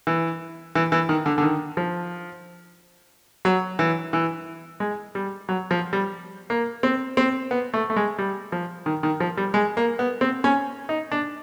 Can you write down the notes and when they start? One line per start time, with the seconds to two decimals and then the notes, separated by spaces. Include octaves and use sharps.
0.07 E3
0.75 E3
0.92 E3
1.09 D#3
1.26 D3
1.38 D3
1.43 D#3
1.77 F3
3.45 F#3
3.79 E3
4.13 E3
4.80 G#3
5.15 G3
5.49 F#3
5.71 F3
5.93 G3
6.50 A#3
6.83 C4
7.17 C4
7.51 B3
7.74 A3
7.90 A3
7.96 G#3
8.18 G3
8.52 F3
8.86 D#3
9.03 D#3
9.20 F3
9.37 G3
9.54 G#3
9.77 A#3
9.99 B3
10.21 C4
10.44 C#4
10.89 D#4
11.11 D4